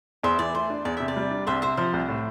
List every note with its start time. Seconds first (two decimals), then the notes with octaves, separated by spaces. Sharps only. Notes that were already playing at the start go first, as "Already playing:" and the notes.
0.23 E2 C5 E5
0.39 E3 D5
0.54 A3 C5
0.70 D4
0.85 E2 D5
0.97 C3 E5
1.08 D5
1.16 G3
1.31 D4
1.47 C2 C5 E5
1.62 C3 C5 E5
1.77 F3 C5
1.93 C2
2.08 A2